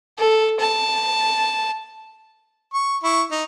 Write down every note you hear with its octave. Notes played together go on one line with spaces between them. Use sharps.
A4
A5
C#6
E4 C#6
D#4